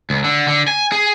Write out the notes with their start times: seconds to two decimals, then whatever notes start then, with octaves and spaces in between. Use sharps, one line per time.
0.10 C#2
0.24 D3
0.48 D3
0.68 G#5
0.92 G#4